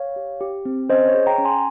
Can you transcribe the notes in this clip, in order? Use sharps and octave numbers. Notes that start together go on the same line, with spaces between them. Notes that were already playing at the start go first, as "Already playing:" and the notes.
Already playing: C#5 F5
G4
G4
C4
C#4 C5 D#5
C#5
G#4
G5 A#5
C#4
G#5 C6